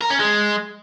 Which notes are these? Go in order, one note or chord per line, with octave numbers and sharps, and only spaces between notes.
A#4
C#4
G#3